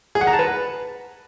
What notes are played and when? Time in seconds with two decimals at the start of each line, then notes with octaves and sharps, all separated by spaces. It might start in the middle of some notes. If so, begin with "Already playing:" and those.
0.15 G#4
0.21 F#5
0.27 A#5
0.33 A5
0.39 B4